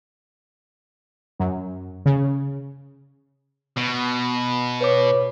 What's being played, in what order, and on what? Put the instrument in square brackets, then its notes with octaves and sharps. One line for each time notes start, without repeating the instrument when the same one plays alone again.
[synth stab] F#2
C#3
[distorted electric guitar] B2
[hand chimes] B4 C#5 D6